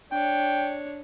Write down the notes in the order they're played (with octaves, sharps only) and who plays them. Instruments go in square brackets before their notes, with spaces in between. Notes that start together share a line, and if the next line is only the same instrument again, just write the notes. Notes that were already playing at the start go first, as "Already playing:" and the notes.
[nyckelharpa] D4 C#5 [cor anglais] G5